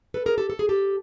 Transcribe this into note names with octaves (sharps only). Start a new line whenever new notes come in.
A4 B4
G#4 A#4
G4 A4
A4
G#4
G4 A4